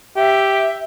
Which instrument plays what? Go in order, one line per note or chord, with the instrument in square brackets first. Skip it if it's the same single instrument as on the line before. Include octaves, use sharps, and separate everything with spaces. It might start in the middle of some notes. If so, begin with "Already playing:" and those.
[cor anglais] G4 [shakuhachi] E5